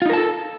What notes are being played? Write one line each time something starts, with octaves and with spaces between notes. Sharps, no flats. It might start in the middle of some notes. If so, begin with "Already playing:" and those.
D#4 F4 A4 A#4 A5